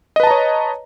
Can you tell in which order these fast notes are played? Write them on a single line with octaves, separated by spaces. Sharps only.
D#5 B4 A5 A#5 C#5